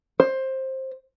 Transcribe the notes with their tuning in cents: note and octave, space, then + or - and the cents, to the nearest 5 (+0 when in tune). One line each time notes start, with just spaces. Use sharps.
C5 +15